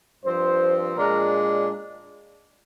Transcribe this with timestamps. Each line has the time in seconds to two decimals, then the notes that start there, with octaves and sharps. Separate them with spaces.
0.24 G2 F3 C4 C5
0.96 A#2 G#3 D4 A#4